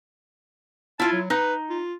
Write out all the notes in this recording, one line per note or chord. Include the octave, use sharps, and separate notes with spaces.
E4 F4 A5
F#3
D#4 B4
F4